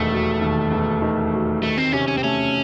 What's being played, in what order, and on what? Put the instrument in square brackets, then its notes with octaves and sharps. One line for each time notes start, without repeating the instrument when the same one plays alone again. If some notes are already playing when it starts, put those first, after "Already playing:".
Already playing: [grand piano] E1 D#2 D#3 [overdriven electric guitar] A3
[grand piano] F#3
D#2
E1
D#3
F#3
[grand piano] D#3 [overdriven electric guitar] A3
[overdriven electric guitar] C4
[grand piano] C3 [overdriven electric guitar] C#4
[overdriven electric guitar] C#4
C4
[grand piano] A3 [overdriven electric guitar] C#4